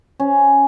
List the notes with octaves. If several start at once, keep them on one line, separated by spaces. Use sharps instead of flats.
C#4